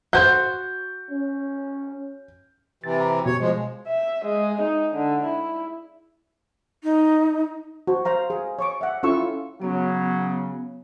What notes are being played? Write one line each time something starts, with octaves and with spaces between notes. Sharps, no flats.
F#4 C5 G6
C#4
C3 E3 A6
A#5
B2 C#5
F3 G#3
E5
G#3
D#4
D3
E4
D#4
F#4 C5
C5 F5 A#5
G#4 F5
C#5 C#6 D6
E5 F#5
C#4 E4 F4 A4 C#6 E6
C#3 F#3 B3